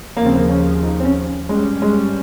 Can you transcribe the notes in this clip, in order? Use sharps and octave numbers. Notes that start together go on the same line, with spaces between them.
D#2 C#3 F3 A#3
C4
A#3
C#4
D#4
C4
C#4
G2 G3 G#3 C#4
G#3